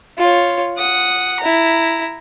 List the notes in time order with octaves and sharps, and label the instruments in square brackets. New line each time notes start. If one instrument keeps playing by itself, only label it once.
[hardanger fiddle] F4 C#5
F#5 D#6
E4 A#5